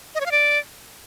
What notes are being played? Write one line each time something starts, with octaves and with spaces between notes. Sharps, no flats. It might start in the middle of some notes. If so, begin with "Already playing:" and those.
D#5
C#5
F5
D5